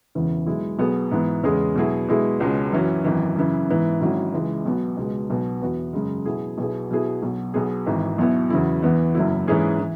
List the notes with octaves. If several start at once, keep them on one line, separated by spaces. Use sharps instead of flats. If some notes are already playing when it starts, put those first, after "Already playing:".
E1 E2 C#3 E3
B1 B2 G#3 E4
B1 B2 B3 G#4
G#2 E3 B3
E2 C#3 G#3 C#4 G#4
B2 F#3 E4 G#4
B2 G#3 E4 G#4
C#2 B2 G#3 C#4
F#2 E3 C#4 F#4
G#1 F#2 E3
F#2 C#3 E3
G#2 E3 B3
G#1 G#2 F#3 C#4 E4
C#2 C#3 E3 G#3
B1 B2 B3 F#4
C#2 B2 G#3
B1 B2 B3 F#4
E2 E3 B3 F#4
F#2 C#3 G#3
B2 F#3 E4 G#4
B1 B2 F#3 E4 G#4
B2 F#3 B3 E4 G#4
B1 B2 F#3
B1 B2 B3 G#4
G#1 G#2 E3
B1 B2 B3 E4
E2 C#3 F#3 E4
E2 E3 B3
F#1 F#2 F#3 E4
G#2 E3 C#4 G#4
E3